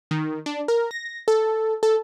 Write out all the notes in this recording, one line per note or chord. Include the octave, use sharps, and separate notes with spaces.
D#3
D4
A#4
A#6
A4
A4